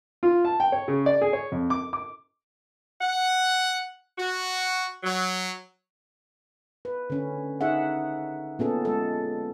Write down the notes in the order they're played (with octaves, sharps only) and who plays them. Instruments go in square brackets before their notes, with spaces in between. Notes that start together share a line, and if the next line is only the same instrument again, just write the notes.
[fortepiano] F4
A5
G5
C#5
C#3
D5
G#4
C#5
F2
D6
D6
[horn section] F#5
F#4
F#3
[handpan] B4
D3 C#4
D#4 G#4 E5 F#5
A#2 B3 C#4 G#4 A4
G#3 A4